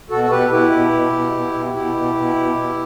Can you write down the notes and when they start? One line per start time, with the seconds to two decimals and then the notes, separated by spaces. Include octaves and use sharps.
0.10 B2 F#4 A4
0.24 A4
0.31 B2 G4 B4
0.50 B2 E4 G4
0.71 B2
0.92 B2
1.12 B2
1.32 B2
1.53 B2
1.73 B2 E4 G4
1.95 B2
2.15 B2
2.36 B2
2.56 B2